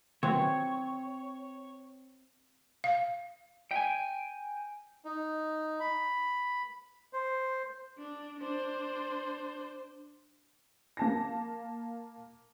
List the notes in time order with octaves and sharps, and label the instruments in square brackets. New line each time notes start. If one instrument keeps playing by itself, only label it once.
[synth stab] D#3 E3 F#3 [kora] C4 [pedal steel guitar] C#5
[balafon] F5
[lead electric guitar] G5 G#5
[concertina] D#4
B5
C5
[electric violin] D4
D4 C5
[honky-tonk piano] A#3 A5 A#6